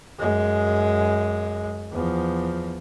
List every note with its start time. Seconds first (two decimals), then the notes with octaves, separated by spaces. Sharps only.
0.19 F#2 G#3
1.93 E2 F3